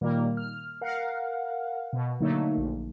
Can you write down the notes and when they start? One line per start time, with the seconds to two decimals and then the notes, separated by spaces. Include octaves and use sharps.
0.01 A#2 D#3 G3 A#3
0.37 F6
0.81 A#4 F5 F#5
1.93 B2
2.20 D3 F#3 A3 A#3 D#4
2.57 A#1